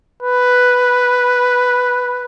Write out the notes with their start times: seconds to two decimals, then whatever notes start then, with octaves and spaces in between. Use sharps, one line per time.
0.22 B4